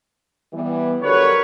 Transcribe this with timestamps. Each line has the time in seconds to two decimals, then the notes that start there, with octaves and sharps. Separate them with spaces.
0.53 E3 G3 B3
1.02 D3 F#3 G3 A#4 B4 C#5